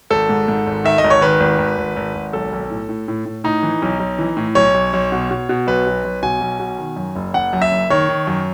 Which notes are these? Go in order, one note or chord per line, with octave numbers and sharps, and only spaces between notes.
G#1 A4
G#2
G#2
G#1
D#3 E5
D#5
G#1
C#5
D#3 B4
G#1
G#1
G#1
G#1
G#1
B1 A4
B1
A2
A2
A2
A2
A2 D#4
E3
B1
B1
E3
A2
B1 C#5
B1
B1
B2
B2
B2
B1 B4
B1
B1
B2 G#5
B1
B2
D#3
F#2
F#1
F#1 F#5
F#2
E5
F#1
D#3 C#5
D#3
F#2